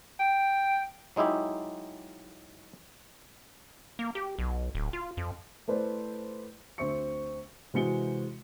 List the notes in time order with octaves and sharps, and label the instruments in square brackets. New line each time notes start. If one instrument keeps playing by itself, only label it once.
[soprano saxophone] G5
[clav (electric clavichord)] F#3 G#3 D#4 E4 G4
[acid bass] A#3
G4
B1
D1
F4
F2
[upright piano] A3 E4 B4 C5 D5
D2 C4 E5 C#6 C#7
C3 E3 G#3 F#4 C#7 G7